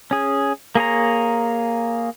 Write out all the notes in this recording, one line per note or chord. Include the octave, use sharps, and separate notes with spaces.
C#4 G#4
A#3 G#4 C#5 A#5